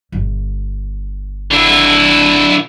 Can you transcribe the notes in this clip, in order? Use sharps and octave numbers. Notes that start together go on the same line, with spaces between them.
G1
D3 E4